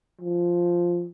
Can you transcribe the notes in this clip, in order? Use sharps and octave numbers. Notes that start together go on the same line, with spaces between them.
F3